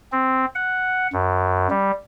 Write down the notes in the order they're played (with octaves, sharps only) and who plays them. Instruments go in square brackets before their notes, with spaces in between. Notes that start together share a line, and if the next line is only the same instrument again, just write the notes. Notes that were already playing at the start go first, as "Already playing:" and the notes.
[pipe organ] C4
F#5
F#2
G3